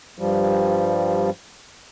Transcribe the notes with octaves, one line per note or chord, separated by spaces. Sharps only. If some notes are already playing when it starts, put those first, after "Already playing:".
G2 F3 G3